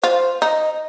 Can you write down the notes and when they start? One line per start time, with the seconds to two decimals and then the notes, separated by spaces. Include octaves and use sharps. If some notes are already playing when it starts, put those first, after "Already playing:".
0.03 F4 C5
0.42 D#4 D#5